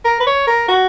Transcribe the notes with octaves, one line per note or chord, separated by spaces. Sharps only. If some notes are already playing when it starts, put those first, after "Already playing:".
A#4
B4
C#5
A#4
F#4